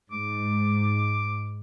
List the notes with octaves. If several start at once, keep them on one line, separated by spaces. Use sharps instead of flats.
G#2 D6